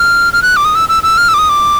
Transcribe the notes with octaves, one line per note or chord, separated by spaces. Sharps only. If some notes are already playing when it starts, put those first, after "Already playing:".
Already playing: F6
F6
F#6
D6
D#6
E6
E6
E6
F6
E6
D6
D#6
D6